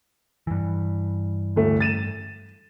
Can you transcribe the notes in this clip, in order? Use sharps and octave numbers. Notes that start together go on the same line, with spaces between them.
G2 E3
D1 A3
A6 D#7 E7